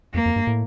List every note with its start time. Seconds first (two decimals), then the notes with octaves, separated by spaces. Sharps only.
0.14 F2 A#3
0.26 F2
0.36 G2
0.47 A2